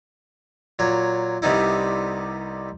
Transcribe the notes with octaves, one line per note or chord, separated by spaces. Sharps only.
A#2 F#3 C#5
C2 C3 G3 B3 D#4 E4